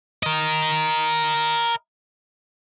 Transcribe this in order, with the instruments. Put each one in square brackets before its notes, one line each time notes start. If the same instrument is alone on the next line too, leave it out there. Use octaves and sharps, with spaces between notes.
[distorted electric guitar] A#4 D#5